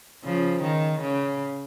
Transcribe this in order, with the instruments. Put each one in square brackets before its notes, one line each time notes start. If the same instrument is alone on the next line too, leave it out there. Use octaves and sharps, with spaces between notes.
[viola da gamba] C#3 F3
D#3
C#3